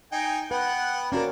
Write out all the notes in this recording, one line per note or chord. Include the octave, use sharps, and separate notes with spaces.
D#4 G5 G#5
B3 B4 F#5 G5
A#3 C#4 D4 F#4 A#4